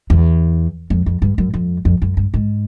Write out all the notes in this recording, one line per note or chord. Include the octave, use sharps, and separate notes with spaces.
E2
F2
F2
G2
F#2
F2
F2
F#2
G2
G#2